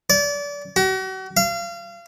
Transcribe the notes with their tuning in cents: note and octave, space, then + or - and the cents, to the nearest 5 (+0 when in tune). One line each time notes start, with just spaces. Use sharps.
D5 -30
F#4 +40
F5 -30